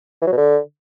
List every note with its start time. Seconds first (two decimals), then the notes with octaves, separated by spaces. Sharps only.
0.21 E3
0.27 F#3
0.32 B2
0.37 D3